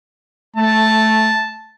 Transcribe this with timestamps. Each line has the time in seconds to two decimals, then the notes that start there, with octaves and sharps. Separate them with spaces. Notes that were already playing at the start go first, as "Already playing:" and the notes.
0.56 A3 A5